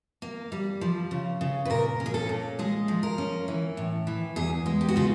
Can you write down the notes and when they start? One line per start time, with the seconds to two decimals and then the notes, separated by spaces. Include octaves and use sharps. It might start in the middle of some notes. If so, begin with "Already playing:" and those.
0.22 A#3
0.52 G3
0.81 F3
1.11 C#3
1.41 C#3
1.65 B4
1.70 A#2 A#4
2.00 C#4
2.06 G#4
2.14 A4
2.29 A#2
2.59 G#3 G#4
2.88 F3
3.03 A#4
3.18 C#4
3.48 E3
3.77 A2
4.07 E3
4.36 E2 G#4
4.66 G#3
4.81 G4
4.88 F#4
4.96 C#3 F4